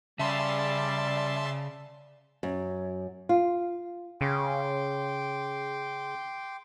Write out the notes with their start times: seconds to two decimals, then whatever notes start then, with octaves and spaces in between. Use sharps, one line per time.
0.19 C#3 G3 D5 E5 A5 C6
2.43 F#2
3.29 F4
4.21 C#3 G5 C6 D6